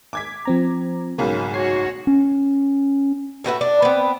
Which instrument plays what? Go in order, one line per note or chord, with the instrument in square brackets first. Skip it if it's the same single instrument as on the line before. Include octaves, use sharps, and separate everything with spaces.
[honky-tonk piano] D6 G#6 B6
[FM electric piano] F3 C4 A#5
[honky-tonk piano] B1 G#2 C#3 [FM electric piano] A#4 F5 B5
[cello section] F#4 C#5 [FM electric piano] G#6 C7
[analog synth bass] C#4
[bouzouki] A2 F#4 B4 E5
D4
B3 C4